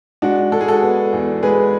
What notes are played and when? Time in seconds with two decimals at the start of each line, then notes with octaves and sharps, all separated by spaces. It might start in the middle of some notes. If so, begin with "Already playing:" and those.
0.22 G#3 D4 F#4
0.52 G#3 A4
0.61 G#4
0.68 F#4 A4
0.82 B3
1.13 E2
1.43 G#3 G#4 B4